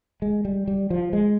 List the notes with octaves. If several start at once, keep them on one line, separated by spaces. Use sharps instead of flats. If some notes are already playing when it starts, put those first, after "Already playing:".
G#3
G3
G3
F3
G#3